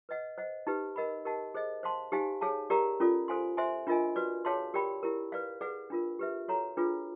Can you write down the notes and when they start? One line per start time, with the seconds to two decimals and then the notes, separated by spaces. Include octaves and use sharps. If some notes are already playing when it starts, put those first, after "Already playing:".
0.09 B4 D#5 F#5
0.38 C5 D#5 F#5
0.67 D#4 G4 B4
0.96 A#4 D#5 F#5 B5
1.25 G4 A#4 D#5 F#5 A5
1.54 G#4 C5 D#5
1.83 C5 F5 A5 C6
2.12 D#4 G4 C5 F5 G#5
2.41 G#4 C#5 F5 A5
2.70 G4 A#4 D5 F5 A#5
3.00 C#4 F4 A4 D5
3.28 A4 C5 F5 G#5 C6
3.57 C5 E5 G#5 C6
3.87 D4 F4 A#4 D#5 G#5
4.16 F#4 B4 D5
4.45 G#4 C#5 F5 A5 C6
4.74 G4 A#4 D5 G5 B5
5.03 E4 G4 A#4
5.32 B4 D5 F5
5.61 G#4 B4 D5 F#5
5.90 D4 F4 A#4
6.19 G4 B4 E5
6.48 F#4 A4 C#5 F#5 A#5
6.77 D4 F4 G#4 B4